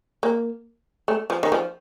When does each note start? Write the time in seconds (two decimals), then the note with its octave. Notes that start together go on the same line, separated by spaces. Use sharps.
0.23 A#3
1.08 A3
1.30 F3
1.43 D#3
1.52 F3